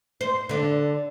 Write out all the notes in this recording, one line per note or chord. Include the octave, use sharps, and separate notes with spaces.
C5
D3 D4